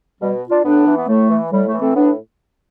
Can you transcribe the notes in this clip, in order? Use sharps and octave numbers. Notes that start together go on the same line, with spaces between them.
B2 G3
D4 F4
A2 B3 D4
E3
B3
A2 A3
E3
A2 G3
A3
E3
A3 C4
A2 B3 D4